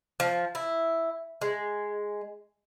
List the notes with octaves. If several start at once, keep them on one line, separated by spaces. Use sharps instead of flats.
F3
E4
G#3